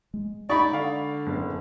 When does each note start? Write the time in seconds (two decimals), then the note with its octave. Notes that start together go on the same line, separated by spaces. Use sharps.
0.14 G#3
0.50 D#4 D5 B5 C#6
0.73 D3 F5
1.26 F#1 B3